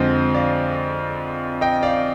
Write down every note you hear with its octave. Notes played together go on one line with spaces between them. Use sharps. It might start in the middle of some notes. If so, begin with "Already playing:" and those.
Already playing: F2 D3 G#3 C4 C5 D#5
D5 F5
D#5 G5
D5 F5